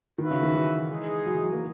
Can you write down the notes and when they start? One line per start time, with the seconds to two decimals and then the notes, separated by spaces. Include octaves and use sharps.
0.18 D#3 F#4 B4 E5
0.31 C#3
0.43 D#3
0.54 E3
0.90 G#3 D#4 G#4
1.26 F#3
1.35 E3
1.43 F#3
1.53 A#3